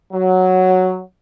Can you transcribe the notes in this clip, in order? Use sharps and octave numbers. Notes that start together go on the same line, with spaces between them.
F#3